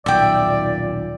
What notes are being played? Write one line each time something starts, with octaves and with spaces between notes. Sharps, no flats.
D#1 B1 A#2 D5 E5 G5